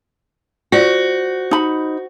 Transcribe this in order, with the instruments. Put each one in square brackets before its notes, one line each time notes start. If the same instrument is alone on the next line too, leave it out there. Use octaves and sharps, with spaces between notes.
[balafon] F4 D5 [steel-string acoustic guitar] F#4 [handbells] C5
[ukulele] D#4 B5